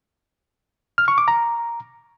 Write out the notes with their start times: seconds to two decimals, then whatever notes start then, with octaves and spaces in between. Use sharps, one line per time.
0.98 F6
1.08 C#6
1.18 D6
1.28 A#5